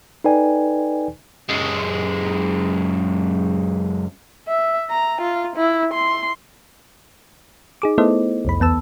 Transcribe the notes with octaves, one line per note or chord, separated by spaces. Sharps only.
D#4 A4 B4 D5 G5 G#5
F#2 G#3
E5
A#5
F4
E4
C6
D#4 G#4 D6
A3 B3 E4 A4 C5 D#5
C2 F2 B5
E2 B3 A5 E6